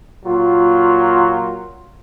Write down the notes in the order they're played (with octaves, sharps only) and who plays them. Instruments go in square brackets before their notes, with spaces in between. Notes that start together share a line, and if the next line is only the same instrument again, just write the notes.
[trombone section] A#2 F#3 F4